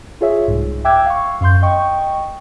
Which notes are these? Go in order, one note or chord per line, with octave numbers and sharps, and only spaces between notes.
F4 G#4 C#5 E5
C2 G#2
E5 G5 D6 E6 F#6 G#6
F5 C#6
F#2 F5 C6 G6
D#5 G5 C#6